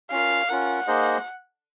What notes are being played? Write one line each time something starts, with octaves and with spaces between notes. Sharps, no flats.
C#4 F4 A#4 F5
C#4 F4 A#4 F#5
A#3 D#4 G#4 C5 D#5